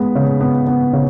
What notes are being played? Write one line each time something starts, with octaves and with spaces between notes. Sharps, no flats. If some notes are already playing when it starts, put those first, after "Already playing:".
Already playing: G#3 B3
C#3
B3
B3
C#3